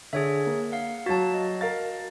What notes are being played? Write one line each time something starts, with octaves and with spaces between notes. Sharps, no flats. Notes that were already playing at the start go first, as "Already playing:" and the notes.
D3 G#4 C#5 E5
A#3
F5 F#5
F#3 F#4 F5 A5 A6
F#4 D#5
A#4 F5 A6